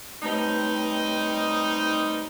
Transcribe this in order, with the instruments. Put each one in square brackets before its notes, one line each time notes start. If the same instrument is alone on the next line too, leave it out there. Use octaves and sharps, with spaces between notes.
[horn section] G3 C4 D#4 [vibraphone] A3 B4 C#5